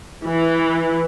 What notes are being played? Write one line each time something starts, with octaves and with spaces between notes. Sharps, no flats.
E3